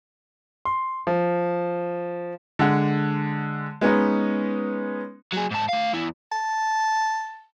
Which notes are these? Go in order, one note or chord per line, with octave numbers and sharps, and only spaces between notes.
C6
F3
D3 G#3 F#5
G#3 B3 C#4 D#4 B4
F#3 G#4
G#2 A5
A3 F5
E2 E4
A5